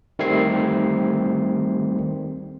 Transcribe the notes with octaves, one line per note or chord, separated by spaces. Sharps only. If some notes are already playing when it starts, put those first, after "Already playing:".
D#3 G3 A3 C4 G#6 C7